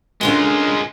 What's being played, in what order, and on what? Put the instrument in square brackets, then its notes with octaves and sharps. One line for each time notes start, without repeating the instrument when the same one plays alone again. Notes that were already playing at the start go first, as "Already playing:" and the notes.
[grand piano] D3 G7 [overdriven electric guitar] G#3 F4 [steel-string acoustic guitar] C#4 G#4 A#4